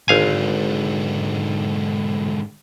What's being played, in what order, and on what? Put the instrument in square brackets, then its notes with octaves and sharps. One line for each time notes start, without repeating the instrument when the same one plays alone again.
[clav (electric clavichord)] G#1 F5 G#5 [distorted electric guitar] G#2 D3